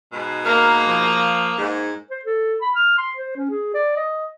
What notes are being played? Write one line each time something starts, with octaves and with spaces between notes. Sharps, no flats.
G#2 B2 G#3
A#3 A#4
F3
G#2
C5
A4
B5
F6
C6
C5
C#4
G#4
D5
D#5